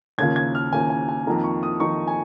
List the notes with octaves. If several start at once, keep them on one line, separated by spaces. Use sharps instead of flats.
D#2 C#3 A#3 F4 G#6
G#6
F6
D#2 C#3 A#3 F4 G#5
G#5
G#5
F2 D#3 A#3 D#4 A#5
C#6
D#6
F2 D#3 A#3 D#4 C#6
G#5